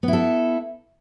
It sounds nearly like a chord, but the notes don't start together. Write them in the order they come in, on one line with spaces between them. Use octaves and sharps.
B3 E4 A4